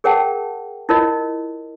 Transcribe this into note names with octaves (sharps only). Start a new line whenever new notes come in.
G#4 A#4 C#5 F#5 G5 A5
E4 F4 A#4 C#5 D#5